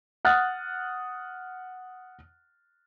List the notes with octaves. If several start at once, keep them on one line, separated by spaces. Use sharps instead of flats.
F#5 D#6 F6 F#6 A6